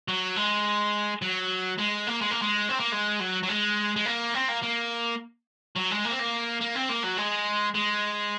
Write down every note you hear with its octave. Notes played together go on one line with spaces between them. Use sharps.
F#3
G#3
F#3
G#3
A#3
G#3
A#3
G#3
C4
A#3
G#3
F#3
F#3
G#3
G#3
A#3
C4
A#3
A#3
F#3
G#3
A#3
C4
A#3
A#3
C4
A#3
F#3
G#3
G#3